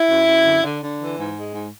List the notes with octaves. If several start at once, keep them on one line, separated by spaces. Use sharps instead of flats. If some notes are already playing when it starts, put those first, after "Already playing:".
Already playing: E4
F#2
F#2
D3
D3
D3
E3
G#2
G#3
G#2